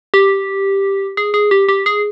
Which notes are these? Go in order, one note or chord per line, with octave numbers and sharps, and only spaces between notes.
G4
G#4
G#4
G4
G4
G#4